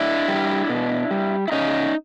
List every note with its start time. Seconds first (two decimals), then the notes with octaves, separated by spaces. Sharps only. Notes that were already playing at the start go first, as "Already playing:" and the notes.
Already playing: D4 E4
0.28 G3
0.69 B2
1.11 G3
1.48 E4
1.52 C#3 C#4 D#4